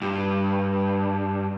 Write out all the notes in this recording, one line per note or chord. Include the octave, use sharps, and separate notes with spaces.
G2